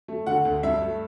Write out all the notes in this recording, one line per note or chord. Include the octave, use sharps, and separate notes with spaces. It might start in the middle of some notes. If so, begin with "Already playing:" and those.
A3
D3 F#5
D2
G2 E5
A3